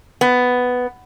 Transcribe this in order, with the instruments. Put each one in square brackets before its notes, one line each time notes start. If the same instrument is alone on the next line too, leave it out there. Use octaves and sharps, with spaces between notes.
[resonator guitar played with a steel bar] B3